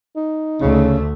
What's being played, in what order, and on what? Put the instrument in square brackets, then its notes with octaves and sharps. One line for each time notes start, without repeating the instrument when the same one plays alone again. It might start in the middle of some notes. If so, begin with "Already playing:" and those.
[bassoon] D#4
[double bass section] D2 A3 [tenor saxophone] C#3